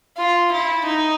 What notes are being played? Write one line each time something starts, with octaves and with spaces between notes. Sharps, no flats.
F4
E4
D#4